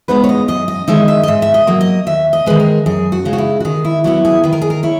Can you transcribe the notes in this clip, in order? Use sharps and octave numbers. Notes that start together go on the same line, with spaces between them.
C#3 G#3 B3 D#4 B4
C#5
D#5
F#2 D#5
D#5
D#3 G#3 D#4 E5
E5
D#5
G#2 E5
E5
D#5
F#3 A#3
D#5
D#2 E5
D#5
D#3 G#3 B4
A#4
F#2 G#4
F#4
C#3 G#3 D#4
F#4
E4
F#4
D#3 G#4
E4
F#3 B3 E4 F#4
G#4
D#3 B4
A#4
G#4
A#4
E4 C#5